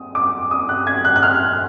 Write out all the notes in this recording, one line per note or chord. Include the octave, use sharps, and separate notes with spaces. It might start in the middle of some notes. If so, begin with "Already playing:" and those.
Already playing: D#6
D6
D#6
F#6
G#6
F#6
F#6
F6